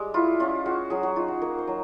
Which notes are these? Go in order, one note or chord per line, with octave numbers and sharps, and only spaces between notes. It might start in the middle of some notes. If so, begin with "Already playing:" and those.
Already playing: G3 G#3
E4 F4
C#4 F4
G#3 F#4
F#3 G#4
F#4
D#4 F4
F#4
A#3 A#4
C5
F#3